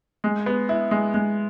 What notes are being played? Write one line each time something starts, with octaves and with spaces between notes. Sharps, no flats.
G#3
B3
E4
G#3
G#3